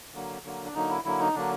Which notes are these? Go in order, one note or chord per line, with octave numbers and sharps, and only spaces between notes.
D3 F#3 A#3
D3 F#3 A#3
D4
D3 F#3 A#3 D#4
E4
D3 F#3 A#3 E4
D#4
D3 F#3 A#3 D4